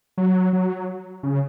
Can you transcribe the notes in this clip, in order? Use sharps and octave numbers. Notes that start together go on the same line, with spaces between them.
F#3
F#3
C#3